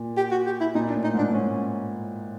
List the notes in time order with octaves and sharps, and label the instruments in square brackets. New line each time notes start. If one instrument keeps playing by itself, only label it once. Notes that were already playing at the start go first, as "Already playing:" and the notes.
Already playing: [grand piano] A#2
[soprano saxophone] G4
F#4
G4
E4
[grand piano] A#2 [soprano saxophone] D#4
[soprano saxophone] D4
[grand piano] A2
[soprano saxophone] D#4
[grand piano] G#2 [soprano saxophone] D4
[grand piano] G#2 [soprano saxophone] C#4